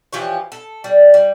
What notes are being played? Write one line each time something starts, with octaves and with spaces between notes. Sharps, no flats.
E3 F3 G4 C#5
A4
G3
G3